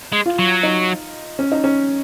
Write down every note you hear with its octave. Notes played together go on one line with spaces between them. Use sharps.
G#3
F4
F#3
D#4
C#4
D#4
C#4